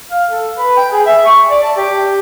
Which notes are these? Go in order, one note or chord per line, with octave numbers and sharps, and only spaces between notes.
F5
A4
B4
G5
G#4
E5
C#6
D5
A5
G4